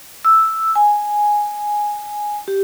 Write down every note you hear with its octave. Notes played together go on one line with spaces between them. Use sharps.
E6
G#5
G4